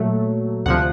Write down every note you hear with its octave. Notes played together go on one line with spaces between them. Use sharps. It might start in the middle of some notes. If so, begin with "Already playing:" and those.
Already playing: A#2 F#3 A3
D2 C3 F3 F#5